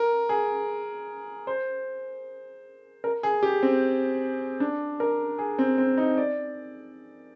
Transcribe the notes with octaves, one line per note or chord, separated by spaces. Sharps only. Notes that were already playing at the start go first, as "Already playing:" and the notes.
Already playing: A#4
G#4
C5
A#4
G#4
G4
C4
D4
A#4
G#4
C4
C4
D#4
D5